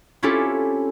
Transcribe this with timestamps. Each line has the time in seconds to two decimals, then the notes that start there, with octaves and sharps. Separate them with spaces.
0.23 C4 C#4 E4 F4 G4 A4